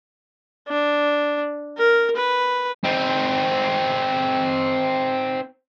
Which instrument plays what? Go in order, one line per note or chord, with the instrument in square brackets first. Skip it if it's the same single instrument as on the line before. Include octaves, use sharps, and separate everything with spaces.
[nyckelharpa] D4
A#4
B4
[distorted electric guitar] C4 D#4